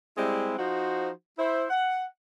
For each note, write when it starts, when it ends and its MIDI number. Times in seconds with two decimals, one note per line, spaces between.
0.17 0.53 55
0.17 0.53 56
0.17 0.53 60
0.17 0.53 64
0.57 1.10 53
0.57 1.10 63
0.57 1.10 66
0.57 1.10 72
1.37 1.65 64
1.37 1.65 72
1.70 2.04 78